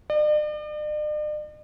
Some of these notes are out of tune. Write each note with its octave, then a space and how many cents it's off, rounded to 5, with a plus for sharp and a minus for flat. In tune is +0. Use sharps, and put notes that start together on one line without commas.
D5 +45